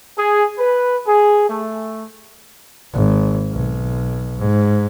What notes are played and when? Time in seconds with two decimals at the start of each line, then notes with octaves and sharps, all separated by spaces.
0.17 G#4
0.59 B4
1.07 G#4
1.49 A3
2.93 G#1
3.52 B1
4.39 G#2